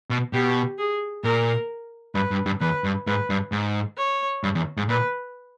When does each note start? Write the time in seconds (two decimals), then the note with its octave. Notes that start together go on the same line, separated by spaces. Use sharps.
0.10 B2
0.33 B2 G4
0.78 G#4
1.24 A#2 A#4
2.15 G2 B4
2.31 G2
2.46 G2
2.61 E2 B4
2.84 G2
3.07 G#2 B4
3.30 G2
3.52 G#2
3.98 C#5
4.44 G2
4.55 E2
4.77 G#2
4.89 A#2 B4